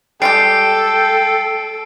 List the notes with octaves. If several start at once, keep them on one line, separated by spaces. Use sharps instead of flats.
G3 G#3 G4 A4 G5 C7 D7